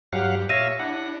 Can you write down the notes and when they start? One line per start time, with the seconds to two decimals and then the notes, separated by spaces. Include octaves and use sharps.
0.13 G2 F#3 G4 F5 F#5
0.49 A#2 C#5 E5 F5 A#6 D#7
0.79 D4 E4 F#5